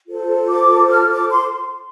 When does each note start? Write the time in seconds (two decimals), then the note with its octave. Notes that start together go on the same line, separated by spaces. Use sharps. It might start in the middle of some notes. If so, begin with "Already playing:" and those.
0.07 F4 A4 C5
0.49 D6
0.90 F6
1.11 D6
1.31 C6